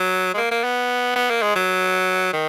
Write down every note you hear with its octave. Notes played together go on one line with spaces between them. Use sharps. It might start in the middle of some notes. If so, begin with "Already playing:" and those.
Already playing: F#3
G#3
A#3
A#3
B3
B3
A#3
G#3
F#3
D#3